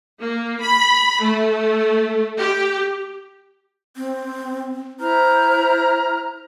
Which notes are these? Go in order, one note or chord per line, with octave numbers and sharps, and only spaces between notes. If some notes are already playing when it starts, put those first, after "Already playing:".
A#3
B5
A3
G4
C4
E4 C5 A#5 F6